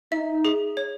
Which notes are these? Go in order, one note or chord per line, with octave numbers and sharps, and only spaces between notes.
D#4 E5
G#4
C#5